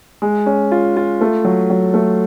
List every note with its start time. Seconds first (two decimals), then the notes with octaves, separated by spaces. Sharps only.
0.22 G#3
0.46 C#4
0.72 F4
0.97 F4
1.21 A3
1.45 F#3
1.70 F#3
1.94 A3